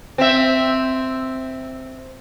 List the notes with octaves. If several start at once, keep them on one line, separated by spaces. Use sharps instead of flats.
C4 E5